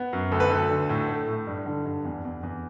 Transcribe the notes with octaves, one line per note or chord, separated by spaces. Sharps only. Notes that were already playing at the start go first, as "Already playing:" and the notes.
Already playing: B3
F#2
D2 A4
B4
D2 A4
D3
A2
A3
A2
G2
D3
G2
E2
E2
E2